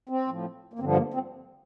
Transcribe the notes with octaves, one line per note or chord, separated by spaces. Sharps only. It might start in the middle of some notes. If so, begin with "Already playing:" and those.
C4
A2 F3
A#3
G2 D3 F3 C4
A#3
C4